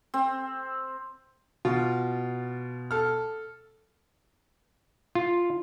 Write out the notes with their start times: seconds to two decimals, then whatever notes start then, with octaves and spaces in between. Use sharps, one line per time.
0.14 C4
1.65 B2 F4
2.91 A4 F6
5.15 F4